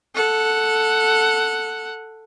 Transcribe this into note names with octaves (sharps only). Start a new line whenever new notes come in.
A4 F#5